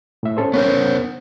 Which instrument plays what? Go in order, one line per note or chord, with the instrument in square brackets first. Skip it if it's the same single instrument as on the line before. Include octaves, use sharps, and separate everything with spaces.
[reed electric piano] A2 E5
C#4 A4 C5
[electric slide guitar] B3 A#4 C5 [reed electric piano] C#4 C#5